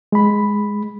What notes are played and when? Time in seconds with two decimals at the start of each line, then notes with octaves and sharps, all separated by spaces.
0.12 G#3 B5